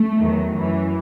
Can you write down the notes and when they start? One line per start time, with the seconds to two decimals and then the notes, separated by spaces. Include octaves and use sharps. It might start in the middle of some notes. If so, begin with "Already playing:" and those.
Already playing: A3
0.18 E2 D#3 F#3
0.55 F#2 E3